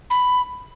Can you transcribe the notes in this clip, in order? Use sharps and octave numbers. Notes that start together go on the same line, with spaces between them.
B5